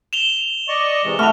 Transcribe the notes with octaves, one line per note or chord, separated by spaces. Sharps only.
E7 F7 G7
D5 D#5 C#6
C3 E3 G#3
A3 F#4 B4 F6 F7